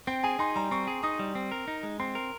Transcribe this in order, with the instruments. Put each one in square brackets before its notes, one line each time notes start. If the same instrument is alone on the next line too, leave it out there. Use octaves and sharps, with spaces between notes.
[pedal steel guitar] C4 [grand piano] G5
[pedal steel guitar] G#4 [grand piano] G#5
[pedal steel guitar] D#4 [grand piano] C6
[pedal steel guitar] G3 [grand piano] A#5
[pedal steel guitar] C4 [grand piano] C#6
[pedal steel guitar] G#4
[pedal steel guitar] D#4 [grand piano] D#6
[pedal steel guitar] G3
C4
A#4
D#4
G#3
[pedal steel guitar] C4 [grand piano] C6
[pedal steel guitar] A#4